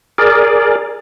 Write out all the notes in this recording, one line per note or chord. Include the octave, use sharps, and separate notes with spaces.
G#4 A#4 D5